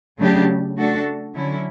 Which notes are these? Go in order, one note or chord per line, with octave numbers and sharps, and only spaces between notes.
C#3 F#3 A3 D4 G4
A3 D4 F#4 A4
D3 F#3 C#4 E4